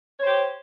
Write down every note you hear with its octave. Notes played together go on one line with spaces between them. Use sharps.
G4 C5 C#5